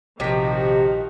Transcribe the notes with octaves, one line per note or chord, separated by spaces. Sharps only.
A#1 C3 D#3 F3 F#4 G4 D#5 B6